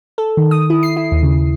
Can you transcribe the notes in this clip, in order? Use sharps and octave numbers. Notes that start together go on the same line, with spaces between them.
A4
D#3
D#6
E4
C7
E4
D#2
C#3